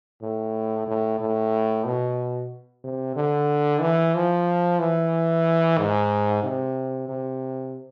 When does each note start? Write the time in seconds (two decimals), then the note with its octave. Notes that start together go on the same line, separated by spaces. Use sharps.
0.22 A2
0.88 A2
1.20 A2
1.85 B2
2.84 C3
3.16 D3
3.81 E3
4.15 F3
4.80 E3
5.78 G#2
6.43 C3
7.09 C3